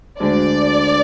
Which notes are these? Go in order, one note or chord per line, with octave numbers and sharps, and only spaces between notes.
D2 D3 G#3 D5